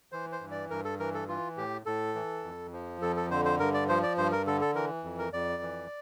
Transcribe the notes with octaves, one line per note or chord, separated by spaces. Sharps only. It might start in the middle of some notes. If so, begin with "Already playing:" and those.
E3 C5
C5
G2
D5
G2 A#4
A4
E3 A#4
A4
E3 F4
A2 G4
A2 A4
E3
F2
F3
F2 A4
A4
D3 C5
C5
G2 A#4
D5
F3 C5
D5
G2 C5
A#4
D3 A4
A4
E3 A#4
F2
A#4
F2 D5
E3